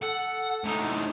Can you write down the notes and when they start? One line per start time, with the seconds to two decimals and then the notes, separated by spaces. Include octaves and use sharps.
0.02 A4 F#5
0.64 A2 D#4